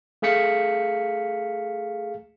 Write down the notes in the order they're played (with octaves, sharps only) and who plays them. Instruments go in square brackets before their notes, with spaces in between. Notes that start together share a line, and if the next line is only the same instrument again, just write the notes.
[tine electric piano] A3 G#4 F5 B6 C#7